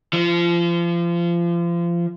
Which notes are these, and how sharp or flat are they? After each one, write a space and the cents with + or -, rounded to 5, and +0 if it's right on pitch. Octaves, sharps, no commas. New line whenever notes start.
F3 -30